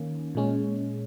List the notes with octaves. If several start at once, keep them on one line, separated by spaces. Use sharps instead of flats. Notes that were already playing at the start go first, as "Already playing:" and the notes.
Already playing: D#3 A#3 C#4
A#2 G#3 C#4